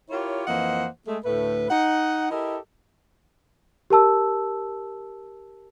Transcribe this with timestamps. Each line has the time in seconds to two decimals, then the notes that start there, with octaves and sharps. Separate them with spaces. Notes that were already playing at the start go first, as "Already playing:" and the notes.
0.10 E4 F4 G4 A#4 C#5
0.47 F2 E3 A#3 C5 D#5 F#5
1.07 G#3 A3
1.24 D2 A2 A3 B4
1.70 D#4 F#5
2.31 E4 G4 A4 A#4 D#5
3.90 G4 A#4 A5 E6